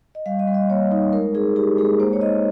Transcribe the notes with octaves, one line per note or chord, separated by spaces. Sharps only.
D#5
G3 F5
D#5
G3
D#5
A#3 C#5
D#4
G#3 A#4
D#4 G#4
D#4 G4
G#3 G#4
A#3 C5
C#5
D#4 D#5